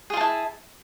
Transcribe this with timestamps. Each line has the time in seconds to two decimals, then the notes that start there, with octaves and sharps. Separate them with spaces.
0.10 G#4
0.14 F4
0.17 A5
0.21 E4